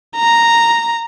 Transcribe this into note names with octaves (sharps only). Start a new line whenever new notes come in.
A#5